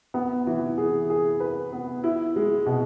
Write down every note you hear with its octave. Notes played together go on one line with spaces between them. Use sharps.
B3
E3
G#4
G#4
B4
B3
E4
G#3
B2